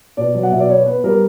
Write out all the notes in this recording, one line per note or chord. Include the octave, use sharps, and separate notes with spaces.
B2 D5
F#3
F#5
B2 E5
D5
B3 C#5
B3 B4
G3 A#4